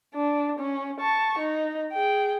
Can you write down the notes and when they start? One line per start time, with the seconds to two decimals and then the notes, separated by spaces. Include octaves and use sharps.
0.15 D4
0.59 C#4
1.00 A5 C#6
1.39 D#4
1.93 G#4 G5